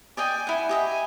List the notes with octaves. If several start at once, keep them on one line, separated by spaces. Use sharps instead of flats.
D5 D#5 G5 G#5
E4 F#5
G4 D#5 E5
G#5